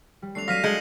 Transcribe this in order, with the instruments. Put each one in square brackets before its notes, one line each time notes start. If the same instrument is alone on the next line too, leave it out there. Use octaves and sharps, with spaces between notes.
[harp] G3
[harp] A3 C4 D4 [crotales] C7 F7
[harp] F#3 C4 [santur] F5 [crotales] A#6 B6 D#7
[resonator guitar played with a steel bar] G#3 [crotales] G6 C#7 F#7